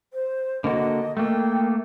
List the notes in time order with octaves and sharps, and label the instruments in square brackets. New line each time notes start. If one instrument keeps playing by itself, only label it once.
[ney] C5
[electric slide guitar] D3 A#3 F#4 [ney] D#5
[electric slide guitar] A3 A#3 [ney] G5